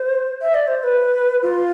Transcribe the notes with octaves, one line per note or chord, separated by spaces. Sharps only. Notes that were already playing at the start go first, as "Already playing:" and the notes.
Already playing: C5
E5
D5
C5
C5
B4
F4